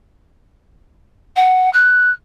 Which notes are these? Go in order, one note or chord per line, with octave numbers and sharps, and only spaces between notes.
F#5
F#6